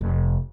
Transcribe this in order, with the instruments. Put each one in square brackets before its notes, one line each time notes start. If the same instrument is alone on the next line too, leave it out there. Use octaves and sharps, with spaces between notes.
[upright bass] F1